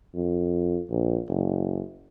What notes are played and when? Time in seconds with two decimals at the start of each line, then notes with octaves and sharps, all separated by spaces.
0.15 F2
0.91 A#1
1.29 F#1